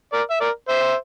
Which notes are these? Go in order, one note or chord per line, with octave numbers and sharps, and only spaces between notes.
A#4 D5
E5
A#4 D5
C5 E5